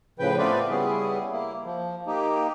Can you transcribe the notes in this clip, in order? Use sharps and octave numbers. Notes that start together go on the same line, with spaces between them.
A2 C#3 F3 B4 G5
A3 B3 C4 F4 B4 D5
C#3 G3 B3 C#4 E4 G#4
A#3 E4
F3
A#3 D#4 G4